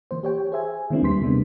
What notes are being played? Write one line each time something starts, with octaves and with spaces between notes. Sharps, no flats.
E3 A#3 C5
G4 C#5 G5
G#4 C5 E5 G#5
D#3 G#3 A#3 C4 D4 E4
D#2 G3 B4 C6 B6
C3 G3 G#3 A#3 B3 D4